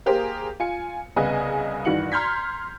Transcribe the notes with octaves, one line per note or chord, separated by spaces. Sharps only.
A#3 G4 G#4 A#4 C5
F4 G#5 C#7
C2 C#3 B3 G#4 D#5 G#5
G2 D#3 E3 F#4 C#7 F#7
A#5 C6 F6 G6 G#6 B6